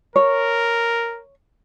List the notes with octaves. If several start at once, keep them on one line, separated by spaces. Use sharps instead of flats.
A#4 C#5